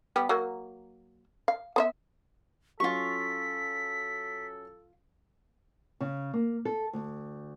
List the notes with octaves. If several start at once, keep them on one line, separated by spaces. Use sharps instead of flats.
G3 B3 G4
F#3 A#3
F5
B3 C5 E5
F#3 C#4 F4 A4 C#6 B6
C#3
A#3
A4
D2